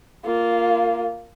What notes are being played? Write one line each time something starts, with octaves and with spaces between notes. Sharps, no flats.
A#3 F4